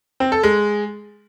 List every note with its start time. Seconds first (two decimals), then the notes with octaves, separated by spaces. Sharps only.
0.20 C4
0.32 A4
0.44 G#3